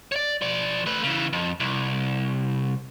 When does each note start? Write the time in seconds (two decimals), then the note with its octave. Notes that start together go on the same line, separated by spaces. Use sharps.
0.12 C#5 D5
0.42 F3 D5
0.86 A3 B4
1.03 C#3 E3
1.33 F2
1.60 C2